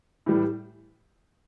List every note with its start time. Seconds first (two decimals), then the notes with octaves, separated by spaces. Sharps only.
0.26 A2 E3 G3